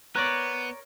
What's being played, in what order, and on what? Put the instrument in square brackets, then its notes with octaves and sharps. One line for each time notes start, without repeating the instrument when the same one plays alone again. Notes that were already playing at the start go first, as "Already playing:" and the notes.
[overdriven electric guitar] B3 [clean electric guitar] A#4 C#5 D5 [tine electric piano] F#6